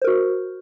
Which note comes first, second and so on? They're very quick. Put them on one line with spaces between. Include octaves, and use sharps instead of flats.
C5 A#4 F#4